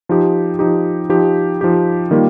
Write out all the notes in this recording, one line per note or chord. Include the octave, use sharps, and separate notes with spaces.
F3 D#4 G4
F3 D#4 G4
F3 D#4 G4
F3 D#4 G4
D#3 G3 A#3 F4